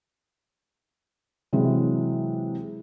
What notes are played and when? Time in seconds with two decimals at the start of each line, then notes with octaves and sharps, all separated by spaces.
1.53 C3 E3 F#3 G#3